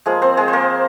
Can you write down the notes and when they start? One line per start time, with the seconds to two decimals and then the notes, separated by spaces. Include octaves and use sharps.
0.06 F3 G#3 A#3 F4 G#4
0.22 C4 C5
0.37 G#3 G#4
0.48 C5
0.53 A#3 A#4